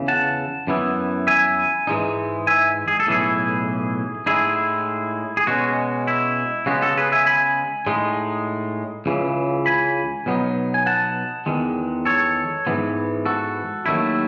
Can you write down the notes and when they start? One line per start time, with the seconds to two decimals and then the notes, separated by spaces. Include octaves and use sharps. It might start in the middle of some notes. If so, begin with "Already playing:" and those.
Already playing: E2 C#3 E3
0.08 F#5 A5
0.67 F#2 E3 B3 E4
1.27 E5 G#5
1.87 G#2 E3 G#3 D#4
2.47 E5 G#5
2.88 G#4
3.00 A4
3.07 B1 A2 E3 E4 G#4
4.26 A2 G#3 D#4 E4 G#4
5.37 G#4
5.47 B2 G#3 C#4 F#4
6.07 E4
6.66 C#3 G#3 B3 F#4
6.81 F#4 A4
6.97 G#4 B4
7.12 E5 G#5
7.26 G#5 B5
7.87 A2 G#3 D#4
9.06 C#2 C#3 E3
9.66 G#5 B5
10.26 B2 F#3 B3 D#4
10.74 G#5
10.86 F#5 A5
11.46 E2 D#3 G#3
12.05 A4 C#5
12.67 G#2 E3 B3
13.25 F#4 A4
13.86 D#2 D#3 F#3 A3 E4